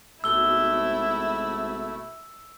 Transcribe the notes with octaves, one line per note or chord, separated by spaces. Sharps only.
G#1 B2 A3 E4 E6 G7